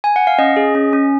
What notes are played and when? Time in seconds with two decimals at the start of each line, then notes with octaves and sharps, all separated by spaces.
0.04 G#5
0.16 F#5
0.27 F5
0.38 C#4 D#5
0.57 G#4
0.75 C#4
0.93 C#4